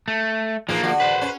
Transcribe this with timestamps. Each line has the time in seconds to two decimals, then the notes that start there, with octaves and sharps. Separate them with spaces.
0.08 A3
0.69 E3 F3 G#3 A#3 D#4
0.83 D3 F#4
1.00 B4 C5
1.21 C#4